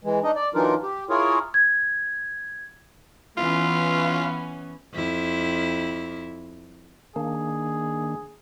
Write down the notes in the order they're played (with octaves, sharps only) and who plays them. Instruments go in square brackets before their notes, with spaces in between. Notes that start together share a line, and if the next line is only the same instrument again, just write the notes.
[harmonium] E3 G#3
D4 D#4 D#5
D5
E3 F#3 D4 D#4 F4 A#4
G4
E4 F4 G#4 A#4 C#5
[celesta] G#6
[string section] E3 B3 C#4 [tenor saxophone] F4
[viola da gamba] F2 E4
[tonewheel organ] D#3 A#3 D4 [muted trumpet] G#4